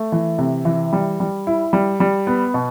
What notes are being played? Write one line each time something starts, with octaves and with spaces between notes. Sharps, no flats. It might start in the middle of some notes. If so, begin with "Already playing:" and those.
Already playing: A3
E3
C3
E3
G3
G3
E4
G3
G3
B3
B2